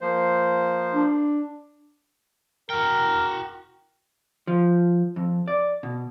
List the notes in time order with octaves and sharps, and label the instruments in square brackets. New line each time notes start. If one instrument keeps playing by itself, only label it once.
[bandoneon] F3 A#3 C5
[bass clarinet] D4
[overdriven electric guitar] F#4 G5 [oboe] A#4
[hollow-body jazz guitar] F3
F2
D5
B2